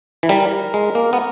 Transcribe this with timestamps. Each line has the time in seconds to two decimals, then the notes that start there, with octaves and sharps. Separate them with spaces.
0.23 E3
0.29 G3 A#4
0.74 G#3
0.95 A#3
1.13 B3